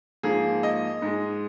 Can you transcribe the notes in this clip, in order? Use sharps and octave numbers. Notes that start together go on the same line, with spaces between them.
G#2 F3 A#3 G#4
D#5
G#2 G#3